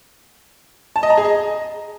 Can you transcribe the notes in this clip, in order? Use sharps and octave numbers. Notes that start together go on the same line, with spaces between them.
A5
D#5
A#5
G#4
D#5